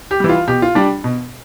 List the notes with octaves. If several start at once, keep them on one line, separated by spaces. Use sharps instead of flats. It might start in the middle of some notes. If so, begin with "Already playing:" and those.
G4
E3 G3
F4
B2 G4
F4
G3 D4
B2